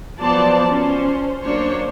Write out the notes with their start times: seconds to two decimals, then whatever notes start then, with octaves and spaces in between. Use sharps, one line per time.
0.20 F3 F#3 B3 C5 D5 A5
0.70 C#4 C5
1.43 F#3 A#3 D4 C5 C#5